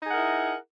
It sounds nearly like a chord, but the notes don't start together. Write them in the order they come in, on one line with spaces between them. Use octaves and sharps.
D#4 G#4 F#5 A#4 E4